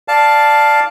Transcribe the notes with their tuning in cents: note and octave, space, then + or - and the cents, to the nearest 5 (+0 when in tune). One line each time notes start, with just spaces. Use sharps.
D5 +0 F5 +0 A5 +0